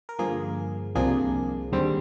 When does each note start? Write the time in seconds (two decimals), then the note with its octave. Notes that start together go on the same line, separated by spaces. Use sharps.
0.09 A#4
0.19 G2 D3 F3 A#3 G#4
0.95 C2 C3 F3 A#3 D4 G#4
1.72 D#2 D3 G3 C4